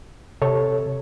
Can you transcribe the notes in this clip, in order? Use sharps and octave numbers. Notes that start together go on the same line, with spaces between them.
C3 A4 C#5